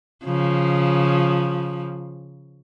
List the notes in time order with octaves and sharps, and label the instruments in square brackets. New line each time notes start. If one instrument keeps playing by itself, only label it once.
[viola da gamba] C#3 F3